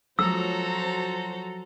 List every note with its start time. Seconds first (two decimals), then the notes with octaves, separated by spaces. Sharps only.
0.19 F3 F#3 F#4 A4 C5 A#5 E6